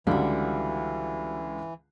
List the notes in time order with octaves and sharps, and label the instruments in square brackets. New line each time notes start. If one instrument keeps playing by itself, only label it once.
[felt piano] C#2 D3 [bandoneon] E3 [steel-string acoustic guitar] G3 F#4